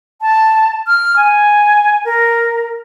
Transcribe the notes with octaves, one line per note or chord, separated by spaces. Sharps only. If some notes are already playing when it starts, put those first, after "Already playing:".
A5
F6
G#5
A#4